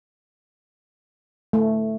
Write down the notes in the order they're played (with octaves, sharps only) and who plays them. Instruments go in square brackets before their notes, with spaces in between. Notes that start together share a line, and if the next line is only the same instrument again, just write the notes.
[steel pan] A3